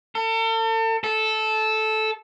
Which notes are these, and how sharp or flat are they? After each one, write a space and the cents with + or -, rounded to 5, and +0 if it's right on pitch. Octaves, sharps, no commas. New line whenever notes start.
A4 +40
A4 -10